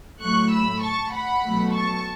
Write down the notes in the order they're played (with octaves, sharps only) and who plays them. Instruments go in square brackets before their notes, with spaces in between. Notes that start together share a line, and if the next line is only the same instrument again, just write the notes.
[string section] A2 F#3 A3 C#6 F#6
B5 E6
A5 C#6
F#5 B5
B2 F#3 A3
A5 C#6